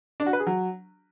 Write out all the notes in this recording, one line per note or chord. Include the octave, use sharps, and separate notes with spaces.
D4
F#4
B4
G#4
F#3